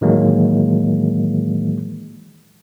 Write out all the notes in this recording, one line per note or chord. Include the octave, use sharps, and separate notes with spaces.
A2 D#3 E3 F#3 G#3 A#3